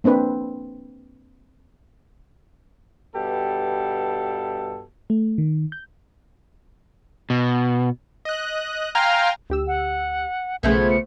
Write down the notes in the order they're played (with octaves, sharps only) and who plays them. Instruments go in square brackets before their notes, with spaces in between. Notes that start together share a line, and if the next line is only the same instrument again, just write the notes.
[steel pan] A#3 C4 D4 B4
[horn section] G2 B2 G4 A4
[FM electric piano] A3
D#3
G6
[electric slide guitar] B2
[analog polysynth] D#5 F#6
F5 G5 G#5 A#5 C6 F6
[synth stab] D2 G4 E6
[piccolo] F#5
[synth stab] B1 C#3 G#4 [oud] F3 A3 B3 [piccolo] G#6
[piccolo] C#7